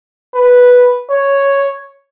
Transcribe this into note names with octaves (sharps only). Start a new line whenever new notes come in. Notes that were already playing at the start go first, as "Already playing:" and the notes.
B4
C#5